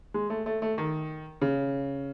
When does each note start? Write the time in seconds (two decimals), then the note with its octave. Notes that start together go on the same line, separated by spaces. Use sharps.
0.14 G#3
0.30 A3
0.46 A3
0.62 A3
0.78 D#3
1.42 C#3